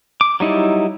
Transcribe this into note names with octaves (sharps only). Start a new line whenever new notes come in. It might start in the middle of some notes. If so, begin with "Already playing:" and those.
D6
F#3 G3 D#4 E4